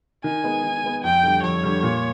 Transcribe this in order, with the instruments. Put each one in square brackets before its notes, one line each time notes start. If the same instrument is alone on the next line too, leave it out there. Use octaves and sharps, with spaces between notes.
[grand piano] D#3 [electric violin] G#5
[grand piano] G#3 B3
D#3
G#3 B3
[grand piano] F2 [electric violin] G5
[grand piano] D3 G3
[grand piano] F2 [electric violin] C#5
[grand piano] D3 G3
A#2